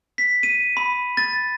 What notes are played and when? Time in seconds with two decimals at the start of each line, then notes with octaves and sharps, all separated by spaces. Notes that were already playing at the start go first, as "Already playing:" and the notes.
0.18 B6
0.43 D#7
0.77 B5
1.17 A6